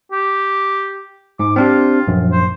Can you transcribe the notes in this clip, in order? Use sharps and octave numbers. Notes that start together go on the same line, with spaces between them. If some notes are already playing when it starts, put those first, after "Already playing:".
G4
G#2 D6
C4 D4 F4 G4
A#1 F#2
C5